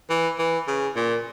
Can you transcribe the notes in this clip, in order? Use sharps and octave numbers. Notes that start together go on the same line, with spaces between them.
E3
E3
C#3
A#2